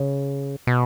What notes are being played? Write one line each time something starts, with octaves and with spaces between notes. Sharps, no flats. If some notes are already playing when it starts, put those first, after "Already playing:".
Already playing: C#3
B2